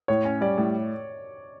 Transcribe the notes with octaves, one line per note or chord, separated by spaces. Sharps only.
A2 C#5
C#4
G3 D5
A2